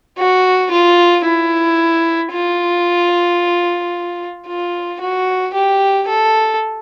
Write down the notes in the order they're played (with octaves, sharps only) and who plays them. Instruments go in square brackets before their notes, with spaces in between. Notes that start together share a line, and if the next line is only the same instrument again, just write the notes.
[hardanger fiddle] F#4
F4
E4
F4
F4
F#4
G4
A4